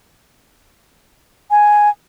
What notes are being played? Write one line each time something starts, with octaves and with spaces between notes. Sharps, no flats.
G#5